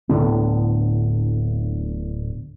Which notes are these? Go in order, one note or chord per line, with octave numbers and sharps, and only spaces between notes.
D1 A2 D3 B3